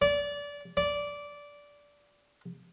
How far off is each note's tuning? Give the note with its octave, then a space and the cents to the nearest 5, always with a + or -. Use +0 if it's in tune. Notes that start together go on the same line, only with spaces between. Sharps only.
D5 -25
D5 -15